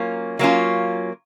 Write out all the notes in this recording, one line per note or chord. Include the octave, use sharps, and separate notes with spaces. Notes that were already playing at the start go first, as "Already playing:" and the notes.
Already playing: F#3 A#3 C#4 F4
F#3 A#3 C#4 F4